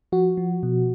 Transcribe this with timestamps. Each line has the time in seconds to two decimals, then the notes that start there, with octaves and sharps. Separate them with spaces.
0.12 F3 F#4
0.37 F3
0.63 B2